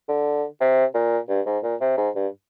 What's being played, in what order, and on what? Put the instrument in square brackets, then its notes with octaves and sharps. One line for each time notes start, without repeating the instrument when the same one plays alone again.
[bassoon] D3
C3
A#2
G2
G#2
A#2
C3
G#2
G2